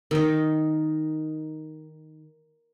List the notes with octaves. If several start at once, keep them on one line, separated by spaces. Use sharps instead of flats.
D#3 D#4